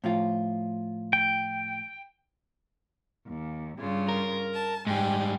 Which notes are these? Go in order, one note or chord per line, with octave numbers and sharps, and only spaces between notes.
A2 F3 F4
G5
D#2
G2 C#3 F4
A#4
A5
G#2 G3 G5 G#5